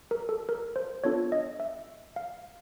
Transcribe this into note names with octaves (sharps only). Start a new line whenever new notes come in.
A#4
A4
A#4
C5
B3 D4 F4 A4 C#5
D#5
E5
F5